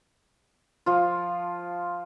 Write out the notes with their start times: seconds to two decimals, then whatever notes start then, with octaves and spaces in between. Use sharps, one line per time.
0.86 F3 F4